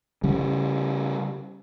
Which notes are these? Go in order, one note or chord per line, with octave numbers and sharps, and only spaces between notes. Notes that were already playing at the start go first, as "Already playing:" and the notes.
C#3 G3